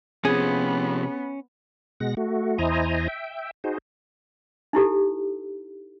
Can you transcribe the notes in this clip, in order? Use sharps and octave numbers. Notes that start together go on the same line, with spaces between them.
C3 F3 B3 C#4 G#4
B2 G#3 F#5 A#6
A3 F#4
E2 E4 C5 D#5 G#5 A#5
E5 G5
D#4 F#4 G#4 C5
D#4 E4 G4 A4